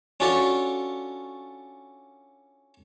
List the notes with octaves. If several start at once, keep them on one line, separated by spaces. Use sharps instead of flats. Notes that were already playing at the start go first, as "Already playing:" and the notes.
C#4 D4 F4 F#4 A4